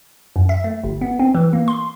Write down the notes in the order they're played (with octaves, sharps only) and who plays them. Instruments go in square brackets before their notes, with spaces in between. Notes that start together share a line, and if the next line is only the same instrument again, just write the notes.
[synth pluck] F#2
E5
A3
G1
B3
C4
E3
A#3
C6